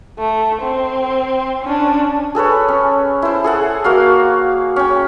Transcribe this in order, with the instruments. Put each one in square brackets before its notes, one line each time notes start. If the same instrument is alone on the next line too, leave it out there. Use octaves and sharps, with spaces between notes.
[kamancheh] A3
C4
C#4 D4
[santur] G#4 A4 B4 C#5
C#4
E4 C5
G#4 A4 F#5
A#3 F#4 F5
C#4 G5